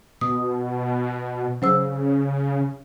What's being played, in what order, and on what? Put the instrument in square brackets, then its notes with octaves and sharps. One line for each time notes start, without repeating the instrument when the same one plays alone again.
[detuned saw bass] B2 [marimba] D#6
[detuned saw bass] C#3 [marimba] F#3 C5 E6